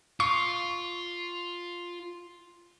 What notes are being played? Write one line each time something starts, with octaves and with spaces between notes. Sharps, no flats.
F4 C#6